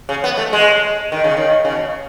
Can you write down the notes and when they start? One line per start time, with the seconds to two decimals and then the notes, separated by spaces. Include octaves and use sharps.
0.09 C#3
0.24 B3
0.37 A3
0.53 G#3
1.12 D#3
1.24 C#3
1.37 D#3
1.65 C#3
1.72 B2